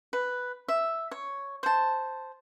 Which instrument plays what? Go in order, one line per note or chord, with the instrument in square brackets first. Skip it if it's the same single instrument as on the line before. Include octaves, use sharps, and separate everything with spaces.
[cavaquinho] B4
E5
C#5
C5 A5